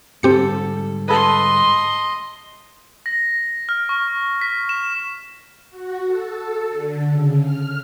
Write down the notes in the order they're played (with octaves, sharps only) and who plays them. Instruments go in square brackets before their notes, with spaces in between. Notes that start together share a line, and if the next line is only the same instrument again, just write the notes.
[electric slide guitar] G#2 D3 G3 [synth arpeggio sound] C4 G4 C#7 [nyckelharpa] A4
[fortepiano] A4 B4 [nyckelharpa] D#5 C6
[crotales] A#6
F6
C#6
B6
E7
[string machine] F#4
A4
A4
D3
C#3
F6